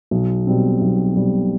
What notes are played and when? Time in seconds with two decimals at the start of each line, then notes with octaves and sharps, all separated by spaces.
0.11 B1
0.47 B2 G3 C4
0.82 B1
1.16 B2 G3 C4